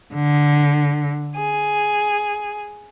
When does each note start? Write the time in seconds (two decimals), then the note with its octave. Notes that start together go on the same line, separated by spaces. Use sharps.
0.13 D3
1.36 G#4